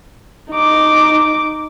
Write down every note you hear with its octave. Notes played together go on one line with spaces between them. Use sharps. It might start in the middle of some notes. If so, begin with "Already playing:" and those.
D#4 D6